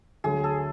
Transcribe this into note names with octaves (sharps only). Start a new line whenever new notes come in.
D2 D3 F#3 G#4
A4